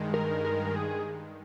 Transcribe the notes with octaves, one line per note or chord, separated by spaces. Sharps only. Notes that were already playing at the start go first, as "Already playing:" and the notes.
Already playing: G2 D#3 G#3
A#4
A#4
G#4